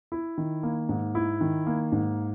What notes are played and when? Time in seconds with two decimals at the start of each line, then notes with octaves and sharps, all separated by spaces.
0.12 E4
0.38 D#3
0.63 A#3
0.89 G#2
1.15 E4
1.41 D#3
1.66 A#3
1.92 G#2